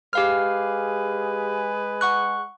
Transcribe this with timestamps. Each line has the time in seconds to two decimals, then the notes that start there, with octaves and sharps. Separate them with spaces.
0.13 G#3 G4 G#4 B4 F5 F6
2.01 F#5 C#6 F#6